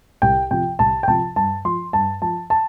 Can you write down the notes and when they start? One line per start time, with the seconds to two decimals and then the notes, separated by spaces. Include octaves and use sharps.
0.22 C2 G5
0.51 C3 F3 G5
0.79 C2 A5
1.03 G5
1.08 C3 F3 A5
1.36 G2 A5
1.65 F3 C6
1.93 G2 A5
2.22 F3 A5
2.50 A5